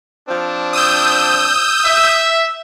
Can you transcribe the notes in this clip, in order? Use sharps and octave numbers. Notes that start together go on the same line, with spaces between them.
F3 C4 D4
D#6 E6 G6
E5